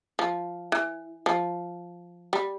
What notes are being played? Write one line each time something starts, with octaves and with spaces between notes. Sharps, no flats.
F3
E3
F3
G3